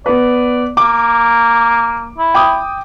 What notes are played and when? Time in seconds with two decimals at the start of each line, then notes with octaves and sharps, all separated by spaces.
0.06 B3 B4 D5
0.77 A#3 D6
2.18 E4
2.35 G5 D6 D#6